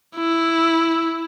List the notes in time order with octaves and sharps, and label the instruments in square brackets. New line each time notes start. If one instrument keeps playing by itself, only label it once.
[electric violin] E4